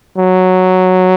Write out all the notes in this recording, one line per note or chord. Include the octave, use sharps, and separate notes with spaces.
F#3